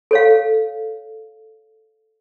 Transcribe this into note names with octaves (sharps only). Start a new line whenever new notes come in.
A4 C#5 F5